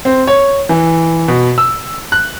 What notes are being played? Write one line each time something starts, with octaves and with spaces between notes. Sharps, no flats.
C4
C#5
E3
B2
E6
F#6